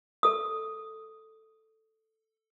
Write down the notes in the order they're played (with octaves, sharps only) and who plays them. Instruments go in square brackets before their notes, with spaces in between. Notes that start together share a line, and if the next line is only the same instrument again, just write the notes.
[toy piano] A4 D#6